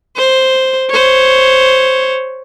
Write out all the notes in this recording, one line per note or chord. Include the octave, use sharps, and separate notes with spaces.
C5
C5 C#5